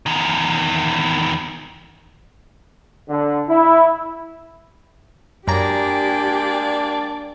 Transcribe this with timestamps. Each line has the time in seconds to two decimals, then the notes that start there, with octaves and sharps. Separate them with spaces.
0.06 E2 D#3
3.08 D3
3.48 E4
5.48 F#2 G#3 A#3 D4 G4 D5 G5 A#5